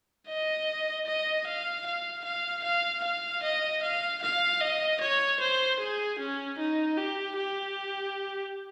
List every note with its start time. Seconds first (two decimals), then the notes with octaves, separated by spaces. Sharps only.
0.28 D#5
1.06 D#5
1.46 F5
1.86 F5
2.24 F5
2.64 F5
3.03 F5
3.43 D#5
3.83 F5
4.22 F5
4.61 D#5
5.00 C#5
5.40 C5
5.80 G#4
6.19 C#4
6.58 D#4
6.97 G4
7.37 G4